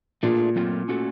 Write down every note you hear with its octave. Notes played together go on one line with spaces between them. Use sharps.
A#2 A3 D4 F4 G#4
F#3 A3 C4 F4 A#4
A3 C#4 F#4 A4